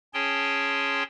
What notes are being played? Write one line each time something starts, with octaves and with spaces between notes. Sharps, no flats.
C#4 G#4 C#5 G5 A5 C6